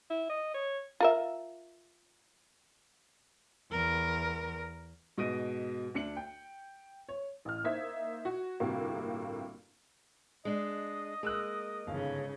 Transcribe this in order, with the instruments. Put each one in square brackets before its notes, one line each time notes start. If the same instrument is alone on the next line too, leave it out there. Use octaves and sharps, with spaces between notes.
[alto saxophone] E4
D#5
C#5
[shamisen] F4 A#4 E5
[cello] E2 A#4
[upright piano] G#2 B2 D#5 A#6 D7 D#7
D2 D4 C#7 F#7
G5
C#5
[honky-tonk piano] A1 F6
A#3 D#4 C5 E5 G#6 B6
F#4
G1 A2 C3 A#3 F#4 G4
[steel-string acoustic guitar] G#3 D4 [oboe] D#5
[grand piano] G#3 E6 F#6 [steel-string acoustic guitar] A#3
[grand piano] G1 F5 [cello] G#2 C#3